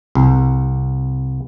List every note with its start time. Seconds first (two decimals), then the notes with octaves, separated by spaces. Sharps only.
0.15 C2